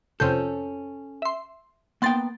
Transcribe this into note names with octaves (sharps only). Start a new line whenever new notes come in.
F2 C3 C#4 A4 G6
E5 C6
A#3 B3 F#5 G5 C6 A6